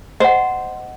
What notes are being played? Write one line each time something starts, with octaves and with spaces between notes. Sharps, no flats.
C5 D#5 F#5